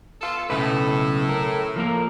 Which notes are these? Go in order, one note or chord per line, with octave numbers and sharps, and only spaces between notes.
B3 F4 A4
B1 A2 C#3 B4
A#4
F3 A#3 A#4